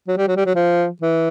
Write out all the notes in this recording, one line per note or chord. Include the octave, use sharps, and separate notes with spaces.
F#3
G3
F#3
G3
F#3
F3
E3